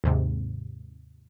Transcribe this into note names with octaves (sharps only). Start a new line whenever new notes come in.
D#2 G#2 C3